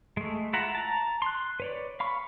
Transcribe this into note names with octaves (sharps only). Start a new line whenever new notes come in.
G#3 A3
E4 F4 E5 F#5 A#5
A5 A#5
C6 F#6
B4 C#5 D5
F5 B5 C#6